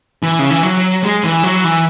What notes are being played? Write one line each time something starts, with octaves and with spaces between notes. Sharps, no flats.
E3
C#3
E3
F#3
G#3
E3
F#3
E3